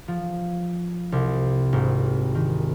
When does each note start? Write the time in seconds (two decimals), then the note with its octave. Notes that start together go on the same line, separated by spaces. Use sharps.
0.08 F3
1.12 C2
1.73 G#1
2.35 D#3